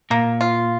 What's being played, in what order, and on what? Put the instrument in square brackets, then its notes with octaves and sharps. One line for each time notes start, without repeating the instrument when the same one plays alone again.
[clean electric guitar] A#2 [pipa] A#3
[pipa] F4